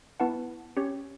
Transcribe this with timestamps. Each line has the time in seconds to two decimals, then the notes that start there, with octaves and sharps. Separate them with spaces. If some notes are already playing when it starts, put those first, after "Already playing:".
0.20 B3 E4 B4 F#5 A5
0.77 C#4 G4 C#5